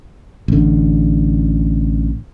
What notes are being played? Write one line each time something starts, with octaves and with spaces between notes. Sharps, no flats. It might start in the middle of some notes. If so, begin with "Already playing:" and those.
A1 D3